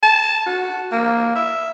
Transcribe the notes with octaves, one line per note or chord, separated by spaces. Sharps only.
A5
F#4
A#3
E5